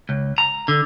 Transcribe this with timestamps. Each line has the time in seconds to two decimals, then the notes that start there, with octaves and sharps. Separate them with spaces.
0.09 C#2
0.38 A#5
0.68 D3